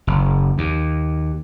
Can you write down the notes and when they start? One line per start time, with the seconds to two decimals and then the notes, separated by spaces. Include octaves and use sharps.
0.07 F#1
0.58 D#2